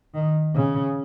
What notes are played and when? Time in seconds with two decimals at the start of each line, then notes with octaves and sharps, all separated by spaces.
0.14 D#3
0.55 C#3